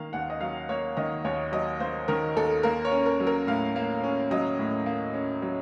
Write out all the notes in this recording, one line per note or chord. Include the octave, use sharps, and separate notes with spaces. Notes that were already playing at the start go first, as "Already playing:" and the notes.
Already playing: D#3 A#3 F5
D#2 F#5
D#5
F#3 F5
A#3 C#5
D#3 D#5
D#2 C#5
F#3 D#5
A#3 C5
D#3 A#4
D#2 A4
A#3 A#4
C#5
C#4
A#4
F#3
A#4
A2 F5
A#3
C#4
F#3 D#5
A2
A#3
C#4
F#3